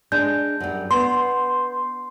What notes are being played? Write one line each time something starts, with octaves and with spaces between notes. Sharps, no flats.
G#3 D4 G6
F#2 G3
B3 C6